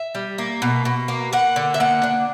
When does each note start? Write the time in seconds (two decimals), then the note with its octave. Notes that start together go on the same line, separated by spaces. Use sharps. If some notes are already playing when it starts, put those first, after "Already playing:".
Already playing: E5
0.15 G3
0.38 A#3
0.62 B2
0.85 B2
1.08 A#3
1.33 A#3 F#5
1.56 D3
1.74 E5
1.80 A#3 F#5
2.03 D4